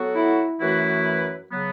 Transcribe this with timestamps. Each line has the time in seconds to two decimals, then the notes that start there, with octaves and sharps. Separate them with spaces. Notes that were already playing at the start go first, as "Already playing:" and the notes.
Already playing: F#3 B3 F#4 A4
0.15 E4
0.60 F#2 E3 A3 E4 F#4 B4
1.51 C#3 F#3 B3